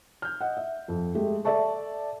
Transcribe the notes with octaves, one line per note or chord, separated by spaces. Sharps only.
F6 G6
D#5 F#5
E5
F2
G#3 A3 G4 G#4
A4 D5 E5 A5 C#6